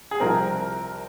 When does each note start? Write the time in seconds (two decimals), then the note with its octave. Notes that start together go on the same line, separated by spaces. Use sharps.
0.11 G#4
0.20 C2 C3 F3 C4 A#4